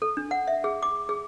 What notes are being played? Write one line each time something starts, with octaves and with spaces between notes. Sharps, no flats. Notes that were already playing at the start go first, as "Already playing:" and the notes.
A4
D4
F#5
E5
G#4
D6
G#4